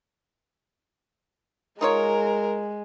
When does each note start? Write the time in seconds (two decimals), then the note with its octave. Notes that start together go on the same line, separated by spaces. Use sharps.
1.81 G#3 D#4 F4 A#4 C#5